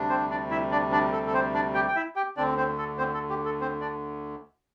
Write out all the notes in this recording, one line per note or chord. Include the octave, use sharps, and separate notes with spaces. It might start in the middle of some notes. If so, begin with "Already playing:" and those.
Already playing: D2 C3 G3 D4
C4 C5
D4 D5
E4 E5
D4 D5
D4 D5
A4
A4
C4 C5
D4 D5
G4 G5
G5
E4 E5
G4 G5
D2 D3 C4 D4 D5
C4 C5
A4
C4 C5
A4
G4
A4
C4 C5
D4 D5